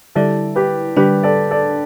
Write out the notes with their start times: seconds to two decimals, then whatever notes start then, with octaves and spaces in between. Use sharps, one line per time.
0.15 D3 G3 E4 A4 D5
0.56 G4 B4
0.97 D3 G3 D4 G4 B4
1.23 A4 D5
1.51 A4 D5